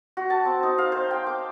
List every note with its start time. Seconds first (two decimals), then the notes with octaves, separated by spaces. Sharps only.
0.17 F#4
0.30 A5
0.45 C4
0.63 D#4
0.78 F5
0.92 C5
1.11 G5
1.27 D6